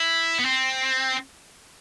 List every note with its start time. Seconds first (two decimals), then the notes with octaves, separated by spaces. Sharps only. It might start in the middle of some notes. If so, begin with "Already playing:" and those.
Already playing: E4
0.39 B3
0.45 C4